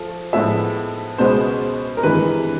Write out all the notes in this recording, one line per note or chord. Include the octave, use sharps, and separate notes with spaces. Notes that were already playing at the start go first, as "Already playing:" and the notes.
Already playing: F3 A3
A2 F3 G#3 B3 E5
C#2 B2 G#3 B3 C5
A#4
G#1 G2 E3 G#3 B4